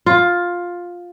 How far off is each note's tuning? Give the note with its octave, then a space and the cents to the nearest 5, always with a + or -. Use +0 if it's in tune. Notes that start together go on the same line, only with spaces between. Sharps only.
F4 +10